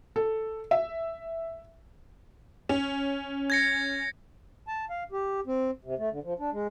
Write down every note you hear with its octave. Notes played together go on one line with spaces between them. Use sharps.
A4
E5
C#4
G#6 A#6 C#7
A5
F5
G4
C4
C3
A3
D3
F3
D4
G#3